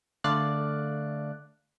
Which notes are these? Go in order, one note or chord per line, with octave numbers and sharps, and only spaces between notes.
D3 A3 D5 F5 F#6